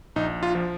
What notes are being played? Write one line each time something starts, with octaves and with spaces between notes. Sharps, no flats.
A#1 D#4
F4
F3